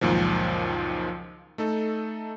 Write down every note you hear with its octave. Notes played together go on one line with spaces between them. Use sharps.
C#2 F#2 A#2 D#3 F3
A3 D#4 A4